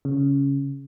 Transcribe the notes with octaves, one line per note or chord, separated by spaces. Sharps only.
C#3